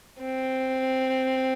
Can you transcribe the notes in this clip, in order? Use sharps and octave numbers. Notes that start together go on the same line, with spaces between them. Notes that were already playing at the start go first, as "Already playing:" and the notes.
C4